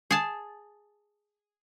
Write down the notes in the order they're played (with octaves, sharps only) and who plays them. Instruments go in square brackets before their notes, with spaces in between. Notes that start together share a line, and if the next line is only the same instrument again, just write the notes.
[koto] G#4 A5